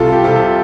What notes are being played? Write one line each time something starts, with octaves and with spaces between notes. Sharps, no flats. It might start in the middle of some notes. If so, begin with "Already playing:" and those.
Already playing: C2 F4 A4
G4
C3 F4 A4